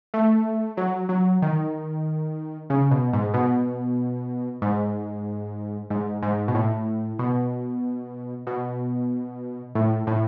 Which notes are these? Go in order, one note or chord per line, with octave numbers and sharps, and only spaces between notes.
A3
F#3
F#3
D#3
C#3
B2
G#2
B2
G#2
G#2
G#2
B2
A2
B2
B2
A2
A2